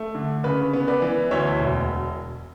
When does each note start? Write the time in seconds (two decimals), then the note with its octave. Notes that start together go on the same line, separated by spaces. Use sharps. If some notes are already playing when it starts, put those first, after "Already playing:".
Already playing: A3
0.15 D3
0.44 C#3 B4
0.73 B3
0.88 B4 D5
1.02 E3
1.31 D2 C#5 E5
1.60 E1